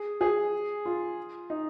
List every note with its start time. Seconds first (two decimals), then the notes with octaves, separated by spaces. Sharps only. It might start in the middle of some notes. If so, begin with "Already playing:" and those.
Already playing: G#4
0.21 G#4
0.85 F4
1.50 D#4